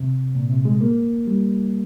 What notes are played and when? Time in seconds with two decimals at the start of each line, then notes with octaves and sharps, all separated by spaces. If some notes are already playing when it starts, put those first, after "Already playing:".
Already playing: C3
0.35 A#2
0.50 C3
0.65 G#3
0.81 A#3
1.27 G3